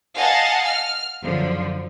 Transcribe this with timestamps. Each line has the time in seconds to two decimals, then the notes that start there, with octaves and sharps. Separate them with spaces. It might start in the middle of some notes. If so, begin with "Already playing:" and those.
0.17 D#5 F5 F#5 G#5 A5
0.66 F6
1.23 F#2 D3 F3